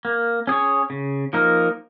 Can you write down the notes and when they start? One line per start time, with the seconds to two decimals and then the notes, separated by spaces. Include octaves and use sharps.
0.05 A#3
0.47 C#4 G#4 C#5
0.90 C#3
1.33 F3 A#3 D#4 A#4